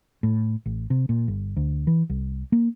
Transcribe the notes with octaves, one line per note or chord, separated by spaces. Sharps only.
A2
A1
C3
A#2
G1
D2
E3
C2
A#3